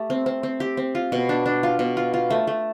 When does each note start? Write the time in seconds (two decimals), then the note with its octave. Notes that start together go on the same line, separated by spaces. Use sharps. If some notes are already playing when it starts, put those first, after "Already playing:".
Already playing: A3 G4
0.10 C4
0.26 C4
0.43 C4
0.60 G4
0.77 C4
0.95 F4
1.12 B2
1.29 D4
1.46 D4
1.63 F4
1.79 B2
1.97 F4
2.14 F4
2.30 A3
2.47 A3